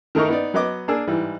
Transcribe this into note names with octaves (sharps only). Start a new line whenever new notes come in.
D#3 A3 D#4 A#4 C#6
B3 D#4 D5
F#3 B3 D#5 D6
A#3 D4 G#4 E6
G#2 E3 G3